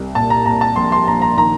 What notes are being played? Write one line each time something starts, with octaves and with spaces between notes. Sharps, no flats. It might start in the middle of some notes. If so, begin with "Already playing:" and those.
Already playing: C2
A#2 A5
A#5
A#2 A#5
A5
A#1 C6
C6
A#1 A#5
A#5
D#3 A#5